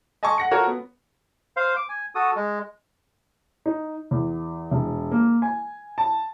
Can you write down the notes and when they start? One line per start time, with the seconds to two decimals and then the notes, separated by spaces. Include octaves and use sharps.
0.23 D#5 G#5 A5 C6 C#6
0.38 F#5 A#6 C#7
0.51 F4 F#4 A4 A#4 C#5
0.67 B3
1.57 C5 F5
1.76 D6
1.89 G#5
2.15 F#4 A4 D#6
2.36 G#3
3.66 D#4
4.11 E2
4.71 E1
5.11 A#3
5.42 G#5
5.98 A5